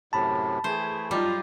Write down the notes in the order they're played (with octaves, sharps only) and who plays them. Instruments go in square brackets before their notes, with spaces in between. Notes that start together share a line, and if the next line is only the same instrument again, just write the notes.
[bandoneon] F#2 A2 C3 [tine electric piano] A5 B5
[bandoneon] E3 A3 [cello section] G#4 [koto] C5
[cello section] F#3 D#4 F4 [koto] G3